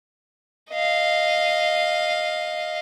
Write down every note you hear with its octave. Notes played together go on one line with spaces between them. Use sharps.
D#5 F5